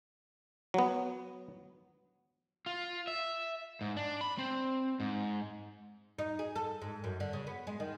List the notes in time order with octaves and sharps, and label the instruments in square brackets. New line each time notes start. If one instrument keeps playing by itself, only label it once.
[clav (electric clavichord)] F#3 B3
[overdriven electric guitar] F4
E5
G#2
D4
B5
C4
G#2
[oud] D#4
G#4
A4
G#2
F#2
D3
C#3
B3
G#3
D#3